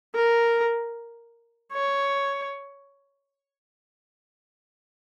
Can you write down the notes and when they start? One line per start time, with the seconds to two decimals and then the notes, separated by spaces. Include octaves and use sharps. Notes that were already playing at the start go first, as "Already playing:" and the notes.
0.16 A#4
1.73 C#5